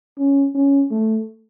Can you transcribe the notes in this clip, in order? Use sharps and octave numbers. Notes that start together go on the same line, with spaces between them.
C#4
C#4
A3